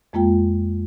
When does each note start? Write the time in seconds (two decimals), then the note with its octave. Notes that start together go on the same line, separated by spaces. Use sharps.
0.13 F2 G#3 A#3 F4 G5